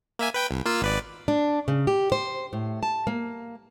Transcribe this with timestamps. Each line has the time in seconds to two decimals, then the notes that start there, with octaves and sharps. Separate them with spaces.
0.19 A#3 E5 G#5
0.34 B4 G5 B5
0.51 C2
0.65 A#3 F4 E6
0.82 G#1 B4 D5
1.28 D4
1.68 C#3
1.87 G4
2.12 C5
2.53 A2
2.83 A5
3.07 A#3